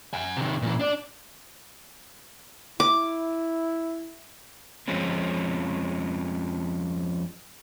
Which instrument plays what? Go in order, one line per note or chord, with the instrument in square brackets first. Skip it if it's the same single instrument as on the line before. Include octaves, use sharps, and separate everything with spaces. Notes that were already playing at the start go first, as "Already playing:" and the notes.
[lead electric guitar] F#5 G#5
C3 D#3
A#2 E3
D4 D5
[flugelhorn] E4 [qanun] D6
[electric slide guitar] F2 F3 G#3 C4 C#4